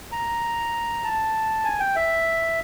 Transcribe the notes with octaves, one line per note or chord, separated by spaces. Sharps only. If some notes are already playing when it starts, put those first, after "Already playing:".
A#5
A5
G#5
G5
E5